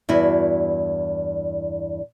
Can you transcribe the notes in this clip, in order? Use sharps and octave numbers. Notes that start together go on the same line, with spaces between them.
E2 G2 E4 F#4